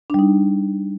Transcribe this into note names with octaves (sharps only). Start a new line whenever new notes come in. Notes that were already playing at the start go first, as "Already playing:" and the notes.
G3 D4 D#4